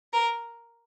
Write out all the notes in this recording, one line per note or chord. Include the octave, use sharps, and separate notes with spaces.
A#4